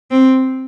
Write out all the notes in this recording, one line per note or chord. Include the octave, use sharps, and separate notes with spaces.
C4